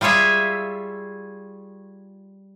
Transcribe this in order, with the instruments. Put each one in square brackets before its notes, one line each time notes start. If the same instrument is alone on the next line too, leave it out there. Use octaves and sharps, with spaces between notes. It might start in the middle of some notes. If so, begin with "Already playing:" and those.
[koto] G3 F4 G#4 C#5 E5